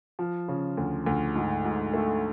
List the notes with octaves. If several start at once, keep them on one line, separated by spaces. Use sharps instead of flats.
F3
C#3
D2
D2
G#2
G#2
A3